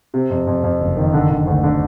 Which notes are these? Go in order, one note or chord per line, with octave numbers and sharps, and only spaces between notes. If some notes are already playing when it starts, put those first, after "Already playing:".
C3
F2
F2
F2
F#1
D#3
D3
D3
D2
D3